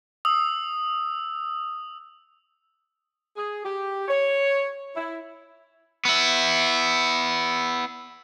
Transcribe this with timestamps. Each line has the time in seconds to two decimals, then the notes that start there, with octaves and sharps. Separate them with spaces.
0.25 D#6 E6
3.36 G#4
3.64 G4
4.08 C#5
4.95 E4
6.05 B3 E4